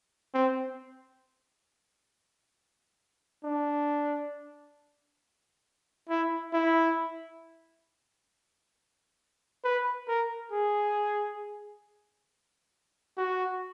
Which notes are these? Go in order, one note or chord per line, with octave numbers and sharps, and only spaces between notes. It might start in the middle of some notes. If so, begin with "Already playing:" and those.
C4
D4
E4
E4
B4
A#4
G#4
F#4